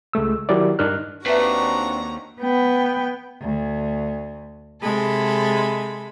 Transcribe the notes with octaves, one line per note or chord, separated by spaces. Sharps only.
C#2 G#3 A3 E6
D#3 F#3 E4 G4 A#4 D5
G2 D4 D#4 A#4 F6 F#6
D#2 C4 D4 F#4 B4 E5 A#5
B3 G5
D2
C3 G#3 A4 B5